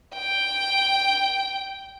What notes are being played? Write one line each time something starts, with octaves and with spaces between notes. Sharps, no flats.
G5